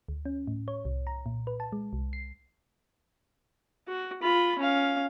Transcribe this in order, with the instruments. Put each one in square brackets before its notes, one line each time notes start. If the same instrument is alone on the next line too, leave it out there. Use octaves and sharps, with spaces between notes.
[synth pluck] D2
C#4
A2
C#5
C2
A#5
A#2
B4
A5
G#3
C2
C7
[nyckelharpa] F#4
F4 B5
C#4 F5